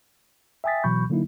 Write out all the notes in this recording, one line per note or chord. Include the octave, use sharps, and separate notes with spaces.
E5 G5 G#5 D#6 A6 B6
B2 E3 F#3 B5 C#6 G6
D3 F#3 A#3 D#4 E4